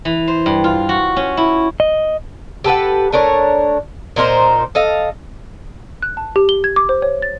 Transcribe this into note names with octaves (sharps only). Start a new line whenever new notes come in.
E3
C5
G2
F4
F#4
C#4
E4
D#5
G4 A4 B4 F#5
A3 D4 A#4 C#5
A#2 D#4 A#4 C5
A4 D#5 F5
F#6
A5
G4
G7
G#6
D6
C5
C#5
A6